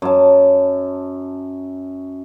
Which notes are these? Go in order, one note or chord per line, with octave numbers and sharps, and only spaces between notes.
F#2 A5